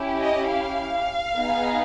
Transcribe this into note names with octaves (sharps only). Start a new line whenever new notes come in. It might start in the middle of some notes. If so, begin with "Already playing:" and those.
Already playing: C#4 E4 G4
D#5
F5
B3 D#4 G#4